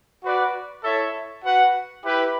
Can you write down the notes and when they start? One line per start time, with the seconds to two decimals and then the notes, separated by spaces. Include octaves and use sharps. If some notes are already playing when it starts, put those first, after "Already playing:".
0.23 F#4 B4 D5
0.84 E4 A4 C#5 E5
1.43 F#4 B4 F#5
2.04 E4 G4 B4